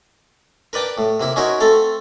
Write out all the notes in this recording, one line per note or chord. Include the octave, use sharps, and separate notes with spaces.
A#4 B4 D5 G5 A5
A2
C3 A#3 E4
C#4 D#4 E4 F#4 A#4 C5
A3 C4 A4 F5